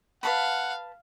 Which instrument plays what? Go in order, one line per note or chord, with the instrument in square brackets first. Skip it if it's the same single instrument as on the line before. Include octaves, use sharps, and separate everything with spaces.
[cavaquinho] B4 A5 B5 [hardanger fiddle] F5 [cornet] F#5